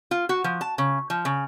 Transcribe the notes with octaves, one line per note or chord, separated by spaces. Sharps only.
F4
F#4
F3
A5
C#3
F3
C#3